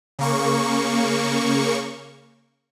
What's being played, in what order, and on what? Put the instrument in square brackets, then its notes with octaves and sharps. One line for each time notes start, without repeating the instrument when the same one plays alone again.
[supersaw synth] C#3 A#3 C#6